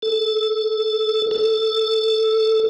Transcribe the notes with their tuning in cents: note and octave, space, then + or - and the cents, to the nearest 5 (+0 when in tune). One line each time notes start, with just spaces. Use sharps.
A4 -10
A4 +0